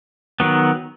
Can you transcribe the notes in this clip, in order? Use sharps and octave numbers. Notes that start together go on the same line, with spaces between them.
D#3 F#3 B3